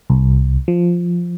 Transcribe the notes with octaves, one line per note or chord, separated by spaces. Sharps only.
C2
F3